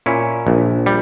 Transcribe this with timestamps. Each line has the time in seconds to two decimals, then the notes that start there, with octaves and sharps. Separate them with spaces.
0.06 A#2 C#4 E4
0.47 A#1
0.86 G3